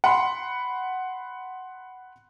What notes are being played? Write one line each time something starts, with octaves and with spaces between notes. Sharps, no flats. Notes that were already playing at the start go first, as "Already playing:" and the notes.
F#5 B5 C6